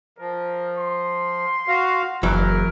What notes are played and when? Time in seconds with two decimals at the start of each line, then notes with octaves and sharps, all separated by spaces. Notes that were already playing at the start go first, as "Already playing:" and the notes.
0.18 F3 A#4
0.78 C6
1.68 F#4 F5
2.23 F#1 E3 F#3 A#4